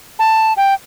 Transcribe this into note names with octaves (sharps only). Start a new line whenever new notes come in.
A5
G5